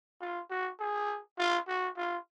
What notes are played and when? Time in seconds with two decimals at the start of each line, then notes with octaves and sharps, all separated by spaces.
0.21 F4
0.50 F#4
0.80 G#4
1.38 F4
1.68 F#4
1.97 F4